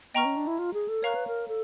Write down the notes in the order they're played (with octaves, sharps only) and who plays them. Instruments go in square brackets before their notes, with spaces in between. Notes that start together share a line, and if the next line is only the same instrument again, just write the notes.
[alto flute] B3 [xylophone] D#5 G5 A#5 C#6 F6
[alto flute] C#4
D4
E4
F4
G#4
A4
[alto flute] A#4 [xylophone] C#5 F5 A#5 C#6 F#6
[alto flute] B4
A#4
A4